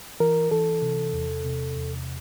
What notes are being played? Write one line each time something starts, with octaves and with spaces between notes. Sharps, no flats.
E3 A#4
E3 A4
C3
E2
C3
E2